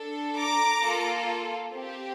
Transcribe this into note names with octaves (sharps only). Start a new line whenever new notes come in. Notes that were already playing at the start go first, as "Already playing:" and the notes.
Already playing: D4 A4
A#5 D6
A#3 F4 A4
C4 G4